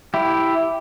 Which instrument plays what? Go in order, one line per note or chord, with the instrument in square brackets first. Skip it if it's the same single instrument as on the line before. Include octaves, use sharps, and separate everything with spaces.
[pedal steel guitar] E4 G4